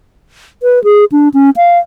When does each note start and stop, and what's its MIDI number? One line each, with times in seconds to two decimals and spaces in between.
0.63 0.82 71
0.84 1.05 68
1.12 1.29 62
1.34 1.50 61
1.57 1.78 77